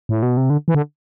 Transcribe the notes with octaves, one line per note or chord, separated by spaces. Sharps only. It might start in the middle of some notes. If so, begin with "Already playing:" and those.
A2
B2
C3
D3
E3
D3